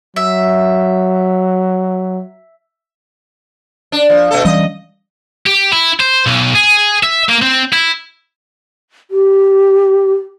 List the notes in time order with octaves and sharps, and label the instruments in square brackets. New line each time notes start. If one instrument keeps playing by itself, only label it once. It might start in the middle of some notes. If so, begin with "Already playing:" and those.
[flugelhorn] F#3 [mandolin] E5
[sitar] D4
F3
B2 A3 A4
[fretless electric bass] E3 G3 C#4 [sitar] D#5
[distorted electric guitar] G4
E4
C5
B1
G#4
E5
A#3
C4
E4
[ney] G4